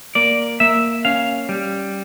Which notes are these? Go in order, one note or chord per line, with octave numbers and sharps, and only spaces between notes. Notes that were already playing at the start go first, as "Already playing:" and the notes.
A#3 D5
A#3 E5
C#4 F5
G3